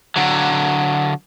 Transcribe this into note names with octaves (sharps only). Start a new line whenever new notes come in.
D3 F#3